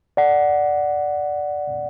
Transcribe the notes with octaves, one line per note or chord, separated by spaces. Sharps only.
D5 F#5